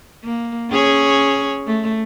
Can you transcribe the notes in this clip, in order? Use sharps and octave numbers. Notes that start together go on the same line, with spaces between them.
A#3
C#4 G#4 C#5
A3